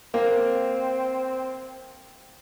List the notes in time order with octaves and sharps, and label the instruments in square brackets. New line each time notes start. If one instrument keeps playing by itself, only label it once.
[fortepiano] A#3 [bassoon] C4